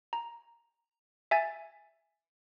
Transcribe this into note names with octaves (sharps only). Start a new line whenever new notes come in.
A#5
E5 G#5 A6